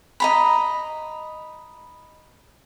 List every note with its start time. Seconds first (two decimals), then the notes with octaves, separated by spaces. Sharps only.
0.20 D#5 A#5 B5